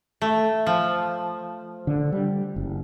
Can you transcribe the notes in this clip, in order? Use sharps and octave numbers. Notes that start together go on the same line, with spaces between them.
A3
F3
D3
G3
F#1